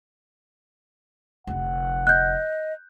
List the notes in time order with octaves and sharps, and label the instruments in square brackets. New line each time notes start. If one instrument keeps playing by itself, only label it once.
[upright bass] F1 D3 [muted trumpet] F#5
[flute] D#5 [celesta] F#6 G6